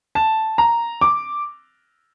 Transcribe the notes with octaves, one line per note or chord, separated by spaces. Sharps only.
A5
A#5
D6